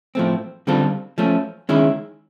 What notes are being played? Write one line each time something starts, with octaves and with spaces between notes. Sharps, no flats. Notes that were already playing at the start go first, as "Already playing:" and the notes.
A2 F3 A3 C4
D3 G3 C4 F4 A4
F3 A3 C#4
D#3 G#3 C#4 E4